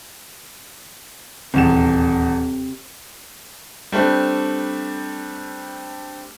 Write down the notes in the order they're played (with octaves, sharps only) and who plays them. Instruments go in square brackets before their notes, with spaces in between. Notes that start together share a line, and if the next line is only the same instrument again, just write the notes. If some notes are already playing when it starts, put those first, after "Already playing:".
[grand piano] D#1 E2 E7 [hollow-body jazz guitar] C3
[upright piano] G3 A3 C4 D4